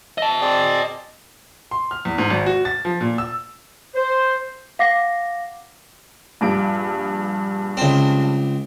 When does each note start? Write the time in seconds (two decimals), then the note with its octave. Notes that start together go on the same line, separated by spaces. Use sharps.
0.18 D#5 E5 A5
0.41 C4 G#4 D5
1.71 C6
1.91 F6
2.05 E2
2.18 G#2
2.30 G#1
2.46 F#4
2.65 A6
2.85 F3
3.01 A#2
3.18 E6
3.96 C5
4.79 F5 F#5 D6 A#6 C7
6.41 A#1 G2 D7
7.77 C#2 C4